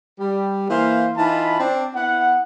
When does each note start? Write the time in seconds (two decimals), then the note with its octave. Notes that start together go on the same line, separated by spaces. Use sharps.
0.20 G3
0.69 E3 A#3 C5 F5
1.17 E3 D#4 F4 A5 B5
1.60 C4 D4
1.95 B3 E4 F#5